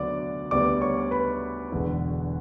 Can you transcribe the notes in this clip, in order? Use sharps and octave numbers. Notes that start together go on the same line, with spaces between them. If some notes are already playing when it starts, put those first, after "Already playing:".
Already playing: D2 D3 F#3 B3 D5 D6
D2 D3 G3 B3 D5 D6
C#5 C#6
B4 B5
E1 E2 D3